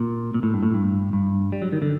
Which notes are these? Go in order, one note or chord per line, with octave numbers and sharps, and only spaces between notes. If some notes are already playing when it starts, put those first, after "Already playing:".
Already playing: A#2
A#2
A2
G2
A2
G2
G2
G3
F#3
D#3
D3